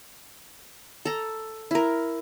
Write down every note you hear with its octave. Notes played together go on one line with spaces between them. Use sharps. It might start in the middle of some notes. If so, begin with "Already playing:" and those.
A4 A#5
E4 A#4